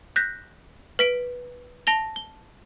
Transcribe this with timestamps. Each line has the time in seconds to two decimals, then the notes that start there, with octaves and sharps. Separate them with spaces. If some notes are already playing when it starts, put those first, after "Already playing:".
0.16 F#6 G6 A#6 B6
0.99 B4 B6 D7
1.87 A5 A#6 F7 G7
2.16 G7